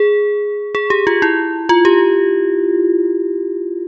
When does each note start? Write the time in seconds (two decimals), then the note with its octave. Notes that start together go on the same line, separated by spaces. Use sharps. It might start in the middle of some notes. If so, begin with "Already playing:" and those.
Already playing: G#4
0.75 G#4
0.90 G4
1.07 F4
1.22 E4
1.69 F4
1.85 G4